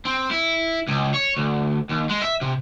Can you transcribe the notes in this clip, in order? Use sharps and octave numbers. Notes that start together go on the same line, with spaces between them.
C4
E4
C#2
C#5
D2
D#2
G#3
E5
C3